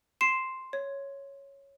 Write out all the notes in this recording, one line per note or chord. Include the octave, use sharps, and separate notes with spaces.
C6 C7 E7
C#5